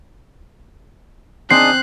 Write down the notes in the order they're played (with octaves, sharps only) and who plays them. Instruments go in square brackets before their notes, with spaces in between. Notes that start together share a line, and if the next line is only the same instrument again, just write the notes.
[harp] C4 [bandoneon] D4 D#4 G#4 [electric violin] F#6 [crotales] C7